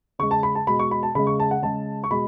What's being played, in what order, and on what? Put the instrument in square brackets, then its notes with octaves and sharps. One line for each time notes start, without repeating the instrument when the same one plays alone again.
[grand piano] C#3 G#3 C#6
A5
B5
A5
B2 G#3 B5
C#6
B5
A5
C#3 B5
G#3
C#6
A5
F#5
C#3 G#3 A5
C#6
B2 G#3 B5